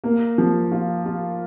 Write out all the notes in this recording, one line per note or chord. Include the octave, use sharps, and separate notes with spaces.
A#3
F3
F4
F4